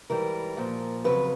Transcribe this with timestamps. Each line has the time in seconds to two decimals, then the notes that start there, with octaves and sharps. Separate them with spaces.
0.09 G#2 E3 G3 A#4
0.57 A#2 F3
1.04 F2 C#3 F#3 B4